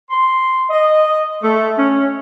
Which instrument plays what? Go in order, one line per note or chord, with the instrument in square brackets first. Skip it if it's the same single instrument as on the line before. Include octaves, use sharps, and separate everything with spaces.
[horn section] C6
D#5
A3
C#4